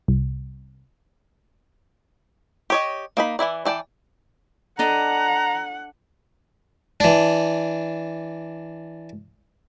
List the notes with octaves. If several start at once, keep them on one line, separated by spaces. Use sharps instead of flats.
C2
G4 C#5 D#5
A#3 D#4 B5
E3 F#3 E4 D5
E3 D5 G5 A5
D4 A4 D#5 F#5 A#5
E3 D4